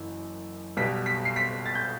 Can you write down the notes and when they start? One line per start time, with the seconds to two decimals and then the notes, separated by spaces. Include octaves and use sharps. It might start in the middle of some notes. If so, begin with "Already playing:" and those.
Already playing: F#1 F#2 E3
0.77 B1 B2 G3 B6
1.06 B6
1.25 C7
1.36 B6
1.66 A6
1.75 G6